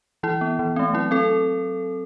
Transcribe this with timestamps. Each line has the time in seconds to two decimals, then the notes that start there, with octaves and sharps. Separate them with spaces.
0.23 E3 E4
0.41 B3
0.59 E3
0.76 A3 C4
0.94 F#3 E4
1.11 C4 A4